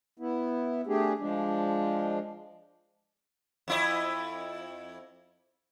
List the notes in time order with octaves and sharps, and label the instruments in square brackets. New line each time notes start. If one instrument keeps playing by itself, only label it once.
[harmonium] B3 E4
A3 D4 G4 G#4
F3 G#3 D4
[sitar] F2 E4 D#5